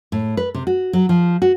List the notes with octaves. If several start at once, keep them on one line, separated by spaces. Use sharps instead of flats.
A2
B4
C3
F#4
F#3
F3
F#4